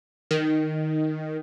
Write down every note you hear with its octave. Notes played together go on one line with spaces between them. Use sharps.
D#3